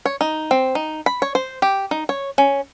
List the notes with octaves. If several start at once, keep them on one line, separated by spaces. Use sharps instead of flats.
C#5
D#4
C4
D#4
B5
C#5
C5
G4
D#4
C#5
C#4